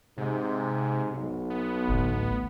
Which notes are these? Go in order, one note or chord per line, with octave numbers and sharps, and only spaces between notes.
G#2 C3
B1
B3
A1 D2